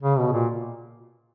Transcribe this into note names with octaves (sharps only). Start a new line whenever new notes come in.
C#3
B2
A#2